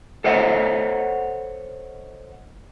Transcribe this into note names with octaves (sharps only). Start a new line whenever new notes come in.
A4 C5 C#5 D#5 F#5